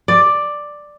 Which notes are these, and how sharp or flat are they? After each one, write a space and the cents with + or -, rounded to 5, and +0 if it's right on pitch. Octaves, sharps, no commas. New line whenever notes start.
D5 +5